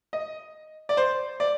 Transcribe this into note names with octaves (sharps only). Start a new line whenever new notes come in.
D#5
D5
C5
D5